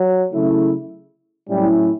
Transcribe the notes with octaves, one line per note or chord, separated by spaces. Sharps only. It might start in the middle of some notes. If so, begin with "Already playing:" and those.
Already playing: F#3
C#3 F#3 A3 E4
A2 F#3 G3 C#4 E4